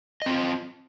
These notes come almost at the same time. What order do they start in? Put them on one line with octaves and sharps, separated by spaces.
D#5 C4 F4